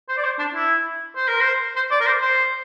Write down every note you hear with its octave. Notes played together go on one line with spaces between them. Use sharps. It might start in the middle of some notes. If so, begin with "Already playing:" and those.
C5
D5
C5
D4
E4
C5
A#4
C5
C5
D5
A#4
C5
C5